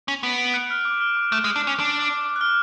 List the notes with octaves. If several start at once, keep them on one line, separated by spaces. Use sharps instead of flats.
C#4 F7
B3 D7
D7
F#6
F6
D6
F6
D6
A3
G#3
D4
C#4
D4 D6
D6
D6
F#6
F6